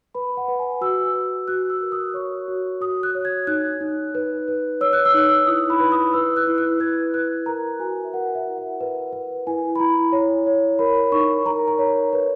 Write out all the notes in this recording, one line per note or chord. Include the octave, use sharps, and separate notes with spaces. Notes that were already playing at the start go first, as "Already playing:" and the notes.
B4 B5
F#5
B4
G#5
F#4 E6
B4
F#4 F#6
E6
A#4
D#6
C#5 C#6
F#4
F#4 D#6
F#6
C#5
G#6
D#4 F#6
D#4
B4
B4
C#5 E6
F#6
E6
D#4 F#6
E6
E4 D#6
B5
B4
D#6
B4 E6
F#6
E4
F#6
B4 G#6
B4 F#6
A#4 A#5
F#4 G#5
E5
A#4 F#5
E5
E4
F#5
B4
B4
E4 G#5
B5
E4 A#5
C#5
C#5
A#4 B5
D#4 C#6
A#4 A#5
A#5
C#5
B4